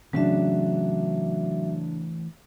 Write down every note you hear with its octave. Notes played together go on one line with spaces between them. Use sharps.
C#3 E3 F#3 A3 C4 D4 F#4 E5